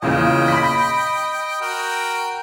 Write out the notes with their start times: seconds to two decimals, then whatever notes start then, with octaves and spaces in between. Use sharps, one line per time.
0.02 E2 A#2 C#3 D#5 G5
0.48 B5 B6
1.61 F#4 A#4 G5